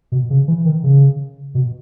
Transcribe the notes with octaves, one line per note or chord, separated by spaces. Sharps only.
B2
C#3
E3
D#3
C#3
B2